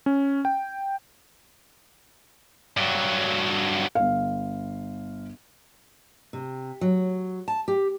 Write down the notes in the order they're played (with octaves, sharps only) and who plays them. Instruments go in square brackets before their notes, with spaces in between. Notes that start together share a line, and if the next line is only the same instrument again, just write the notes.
[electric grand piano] C#4
G5
[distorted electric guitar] G2 F#3
[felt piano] G1 F5
[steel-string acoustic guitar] C3
F#3
A5
G4